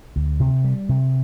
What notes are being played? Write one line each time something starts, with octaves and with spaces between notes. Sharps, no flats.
D2
C3
G3
C3